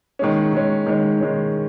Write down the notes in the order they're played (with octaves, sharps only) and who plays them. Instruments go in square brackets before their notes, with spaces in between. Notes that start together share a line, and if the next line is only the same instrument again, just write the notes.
[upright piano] D#3 G#3 C#4
D#3 G#3 C#4
D#3 G#3 C#4
D#3 G#3 C#4